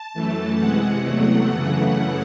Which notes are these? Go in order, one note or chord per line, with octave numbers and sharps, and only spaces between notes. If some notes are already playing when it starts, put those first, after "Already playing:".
Already playing: A5
F#2 E3 A3
C3 E3 G#3 F#5
E2 C3 F#3 A3 F#5
F#2 C#3 E3 A3